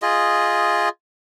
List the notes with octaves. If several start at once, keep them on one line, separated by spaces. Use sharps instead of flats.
F4 G#4 D#5